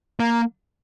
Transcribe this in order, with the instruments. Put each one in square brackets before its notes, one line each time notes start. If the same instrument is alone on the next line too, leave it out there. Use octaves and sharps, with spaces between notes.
[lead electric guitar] A#3